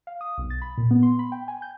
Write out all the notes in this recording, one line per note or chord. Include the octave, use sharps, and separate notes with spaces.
F5
D#6
B1
A6
B5
A#2
B3
C6
B5
G5
G#5
G6